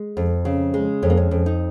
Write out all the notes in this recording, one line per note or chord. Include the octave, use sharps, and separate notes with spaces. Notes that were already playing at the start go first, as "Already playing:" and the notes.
Already playing: G#3
F2
C#3
G#3
F2 C#4
A#3
C#4
F2
D#4